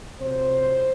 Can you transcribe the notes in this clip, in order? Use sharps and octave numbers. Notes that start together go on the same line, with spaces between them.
F2 C3 F#3 C5